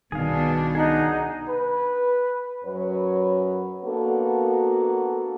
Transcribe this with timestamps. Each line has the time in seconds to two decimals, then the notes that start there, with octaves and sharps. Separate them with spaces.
0.12 C2 B2 D#3 B3 D4 G#4 F5
0.75 D#4 G#4 F#5
1.48 B4
2.65 F#2 F#3 B4 C#5
3.85 A#3 B3 D4 F#4 A4